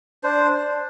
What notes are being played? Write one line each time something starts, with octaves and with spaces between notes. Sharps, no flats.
D4 C5